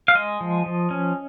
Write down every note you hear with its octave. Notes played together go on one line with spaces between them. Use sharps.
F5
G#3 D#5
F3
F3
C#4